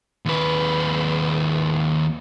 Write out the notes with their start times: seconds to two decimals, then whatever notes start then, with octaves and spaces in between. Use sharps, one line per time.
0.26 D#2 B4